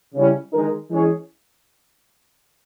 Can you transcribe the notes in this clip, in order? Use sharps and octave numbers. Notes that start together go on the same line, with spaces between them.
C#3 G3 C#4 E4
D#3 G#3 D#4 A#4
E3 G#3 C#4 G#4 C#5